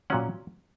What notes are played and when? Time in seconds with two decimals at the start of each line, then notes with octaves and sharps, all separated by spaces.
0.10 A#2 F#3 C#4 F#5